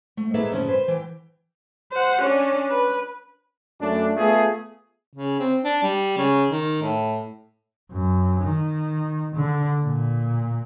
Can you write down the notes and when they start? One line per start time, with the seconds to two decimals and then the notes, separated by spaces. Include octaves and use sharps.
0.17 A3
0.34 A#3 D#4 G#4 A4 B4 E5
0.52 G2 C#3 F3 C#4
0.68 B4 C5
0.88 E3 G5
1.92 C5 F#5
2.22 C#4 D4
2.71 B4
3.80 F#2 A3 D4
4.16 A3 B3 F4 G#4
5.15 C#3
5.39 C4
5.64 D4
5.83 G3
6.17 C#3
6.50 D#3
6.82 A2
7.91 F#2
8.40 D#3
9.35 D3
9.83 A#2